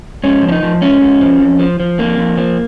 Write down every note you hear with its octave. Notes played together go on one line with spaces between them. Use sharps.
G#2 C#4
F3
C#4
D#4
F3
G#2 C#4
G#2
F3
F2
F3
F3
F2 A#3
F2
F3